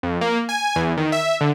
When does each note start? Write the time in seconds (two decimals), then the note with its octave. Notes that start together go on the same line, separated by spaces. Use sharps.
0.03 F2
0.21 A#3
0.49 G#5
0.76 E2
0.97 D#3
1.12 E5
1.41 D3